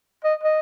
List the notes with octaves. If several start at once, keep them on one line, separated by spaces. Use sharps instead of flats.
D#5
D#5